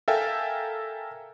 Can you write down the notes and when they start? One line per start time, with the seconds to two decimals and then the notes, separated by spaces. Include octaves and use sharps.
0.08 A4 A#4 E5 F5 G5 G#5